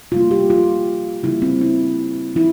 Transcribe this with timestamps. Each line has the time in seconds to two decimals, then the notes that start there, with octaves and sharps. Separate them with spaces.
0.11 C3 G3 A#3 F4
0.31 G4
0.50 F4
1.23 C#3 G3 A#3 E4
1.42 C4
1.61 E4
2.35 E3 E4